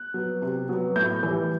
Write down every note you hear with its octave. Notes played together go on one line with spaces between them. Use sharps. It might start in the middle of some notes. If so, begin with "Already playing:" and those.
Already playing: F#6
F#3 B3
C3
F#3 B3
A2 G6
E3 G3